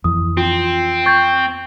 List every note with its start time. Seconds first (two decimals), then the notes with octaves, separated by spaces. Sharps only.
0.04 F2 E3 D#6
0.37 C4 F4
1.06 C#6 G6 A6